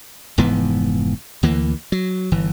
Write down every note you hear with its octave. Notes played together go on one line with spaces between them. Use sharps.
F1 G#2 E3 B3
D2 E3 A#3
F#3
G1 E3